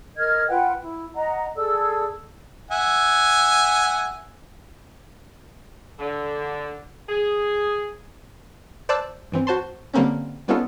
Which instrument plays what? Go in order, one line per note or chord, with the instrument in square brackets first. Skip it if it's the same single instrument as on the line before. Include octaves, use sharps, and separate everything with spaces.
[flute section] A#4 D#5 F6 G#6
F4 B4 F#5 G5
E4
D#5 F#5 A#5
G#4 A4 D5 E6
[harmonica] E5 F#5 G#5
[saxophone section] D3
G#4
[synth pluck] C5 D5 A5 D6 E6 F#6
G2 E3 C4
F#4 C5 A5 C6
D3 G3 A#3 C4 C#4
G3 B3 C#4 D#4 F4 A4